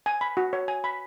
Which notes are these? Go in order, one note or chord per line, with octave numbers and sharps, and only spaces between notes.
G#5
B5
F#4
C#5
G#5
B5